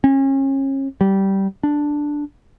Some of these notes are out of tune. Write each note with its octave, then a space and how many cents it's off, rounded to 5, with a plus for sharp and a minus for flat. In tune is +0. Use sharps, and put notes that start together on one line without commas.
C#4 -35
G3 -15
D4 +0